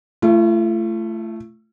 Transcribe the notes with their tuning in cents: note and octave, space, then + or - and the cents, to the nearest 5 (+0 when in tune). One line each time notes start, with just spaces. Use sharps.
A3 +0 F4 -45